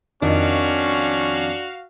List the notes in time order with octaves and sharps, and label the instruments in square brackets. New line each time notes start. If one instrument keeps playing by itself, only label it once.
[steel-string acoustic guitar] F2 D#3 [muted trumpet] C#4 [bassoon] D4 [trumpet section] F#4 F5